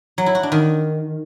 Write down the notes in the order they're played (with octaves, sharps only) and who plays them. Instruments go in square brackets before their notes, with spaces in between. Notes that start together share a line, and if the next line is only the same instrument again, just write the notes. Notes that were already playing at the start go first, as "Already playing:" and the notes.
[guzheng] F#3
E4
F#4
D4
D#3